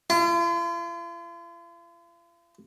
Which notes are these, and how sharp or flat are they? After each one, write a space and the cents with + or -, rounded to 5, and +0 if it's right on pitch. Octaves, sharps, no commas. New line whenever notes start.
F4 -45